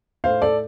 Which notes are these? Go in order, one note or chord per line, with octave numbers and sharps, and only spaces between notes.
A2 C5 F5
A4 D5